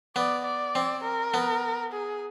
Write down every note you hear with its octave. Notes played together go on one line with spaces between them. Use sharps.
B3 D5
D5
C4
A#4
B3
G#4